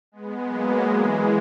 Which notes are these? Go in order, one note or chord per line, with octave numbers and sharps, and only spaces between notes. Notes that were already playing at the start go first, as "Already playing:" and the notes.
G#3 B3
F#3 A#3
E3 G#3